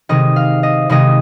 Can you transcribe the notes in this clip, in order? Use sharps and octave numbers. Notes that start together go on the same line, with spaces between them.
C3 D#3 G#3 D#5
F5
D#5
C3 D#3 G#3 D#5